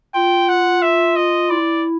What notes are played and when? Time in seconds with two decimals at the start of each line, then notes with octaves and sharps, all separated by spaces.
0.14 F4 G5
0.49 F#5
0.82 E5
1.16 D#5
1.50 E4 D5